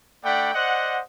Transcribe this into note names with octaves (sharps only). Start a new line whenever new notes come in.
A3 D4 D5 F#5 G5 B5
C5 D5 D#5 F#5